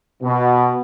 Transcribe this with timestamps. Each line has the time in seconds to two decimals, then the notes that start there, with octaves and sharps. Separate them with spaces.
0.22 B2 B3